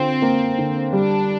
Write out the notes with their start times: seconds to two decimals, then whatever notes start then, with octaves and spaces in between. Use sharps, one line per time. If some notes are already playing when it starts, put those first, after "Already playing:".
Already playing: D3 C4 F4
0.22 A#3
0.58 D3
0.93 G3 D4